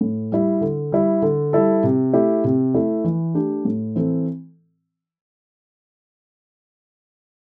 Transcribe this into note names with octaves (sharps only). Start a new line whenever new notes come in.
A2
G3 E4
D3
G3 E4
D3
G3 E4 A4
C3
A3 E4 G4
C3
A3 E4
E3
A3 D4 G4
A2
E3 C4 A4